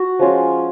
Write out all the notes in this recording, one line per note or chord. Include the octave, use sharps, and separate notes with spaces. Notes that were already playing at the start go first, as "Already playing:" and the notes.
Already playing: F#4
F3 G#3 C#4 F4